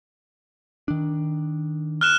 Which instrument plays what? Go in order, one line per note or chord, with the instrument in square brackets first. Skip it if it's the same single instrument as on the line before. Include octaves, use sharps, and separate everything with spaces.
[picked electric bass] D#3 D4
[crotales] F6 F#6 E7